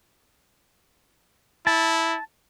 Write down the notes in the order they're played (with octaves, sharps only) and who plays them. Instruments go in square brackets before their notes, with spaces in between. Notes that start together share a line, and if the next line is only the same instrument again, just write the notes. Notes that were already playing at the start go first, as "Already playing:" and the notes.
[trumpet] E4 [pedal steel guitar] A5